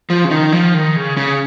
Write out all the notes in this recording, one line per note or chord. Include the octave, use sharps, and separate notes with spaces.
F3
C#3
D#3
F3
D#3
C#3
C#3